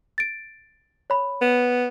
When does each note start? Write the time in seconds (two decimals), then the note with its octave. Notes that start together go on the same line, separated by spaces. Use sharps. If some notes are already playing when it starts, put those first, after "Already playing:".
0.18 A6 D7
1.10 C#5 B5
1.41 B3